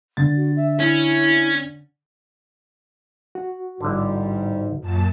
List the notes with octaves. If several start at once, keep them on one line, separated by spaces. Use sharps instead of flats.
D3 A6
F#4
E5
C#4 E4
F#4
A1 G#2 D3 G3
F#2 A#2 A5